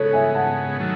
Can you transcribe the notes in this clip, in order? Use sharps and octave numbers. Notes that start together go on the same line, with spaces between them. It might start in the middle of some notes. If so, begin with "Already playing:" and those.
Already playing: C#3 G#3 B3 A4 C#5
E5 G#5
F#5 A5
D#3 F#3 A3